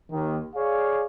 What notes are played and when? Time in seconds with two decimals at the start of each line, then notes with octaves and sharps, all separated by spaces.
0.11 D#2 D#3
0.55 G#4 C#5 D5 F5